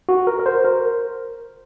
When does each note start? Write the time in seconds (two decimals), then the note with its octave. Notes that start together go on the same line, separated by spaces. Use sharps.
0.09 F#4
0.27 A#4
0.39 A#4
0.46 C5
0.65 A#4